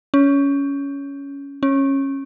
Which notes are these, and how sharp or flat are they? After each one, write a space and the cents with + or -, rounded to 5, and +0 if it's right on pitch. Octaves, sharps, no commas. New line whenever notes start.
C#4 +15
C#4 -20